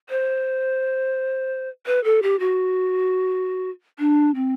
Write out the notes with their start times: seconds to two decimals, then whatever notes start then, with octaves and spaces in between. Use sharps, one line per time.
0.09 C5
1.86 B4
2.04 A4
2.23 G4
2.40 F#4
3.99 D4
4.35 C4